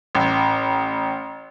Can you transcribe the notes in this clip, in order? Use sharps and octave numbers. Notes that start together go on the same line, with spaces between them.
A1